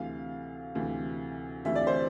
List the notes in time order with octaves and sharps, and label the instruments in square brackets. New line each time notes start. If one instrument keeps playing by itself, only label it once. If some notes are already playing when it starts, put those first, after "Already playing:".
Already playing: [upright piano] D2 C3 E3 F5
D2 C3 E3
D2 C3 E3 E5
D5
C5